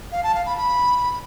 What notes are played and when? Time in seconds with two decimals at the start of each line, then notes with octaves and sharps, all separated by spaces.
0.12 F5
0.23 A5
0.35 F5
0.46 B5
0.57 B5